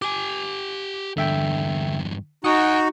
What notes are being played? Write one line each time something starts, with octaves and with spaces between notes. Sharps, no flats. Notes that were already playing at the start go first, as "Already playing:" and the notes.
G4 G#5 D6
E2 G2 D3 E5 G5
D#4 F#4 F#5 G#5 D#6